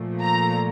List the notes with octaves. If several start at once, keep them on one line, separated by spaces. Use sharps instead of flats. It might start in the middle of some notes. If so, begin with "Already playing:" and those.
Already playing: A#2 F3 A3
A#5